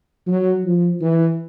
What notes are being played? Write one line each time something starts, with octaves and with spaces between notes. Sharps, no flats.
F#3
F3
E3